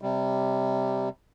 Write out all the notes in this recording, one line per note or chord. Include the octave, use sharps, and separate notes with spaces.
C3 G3